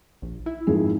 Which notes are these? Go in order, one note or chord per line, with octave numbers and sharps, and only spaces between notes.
A#1
E4
G#1 F3 G#4